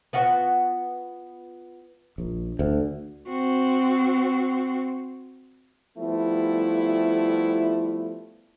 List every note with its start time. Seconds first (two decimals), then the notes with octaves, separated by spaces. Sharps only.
0.13 B3 F4 F#4
2.18 A#1
2.59 D2
3.28 C4 F#4
5.98 F3 G3 A3 B3 E4